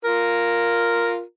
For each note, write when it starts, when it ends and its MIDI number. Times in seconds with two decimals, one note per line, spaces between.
0.05 1.21 65
0.05 1.21 70